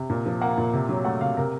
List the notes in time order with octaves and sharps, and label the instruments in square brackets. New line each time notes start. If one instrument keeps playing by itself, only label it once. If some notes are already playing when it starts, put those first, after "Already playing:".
Already playing: [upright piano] C3
A#2
F3
A#3 F#5
A#2
C3
F#3
A3 F#5
C3 F5
C3 A#4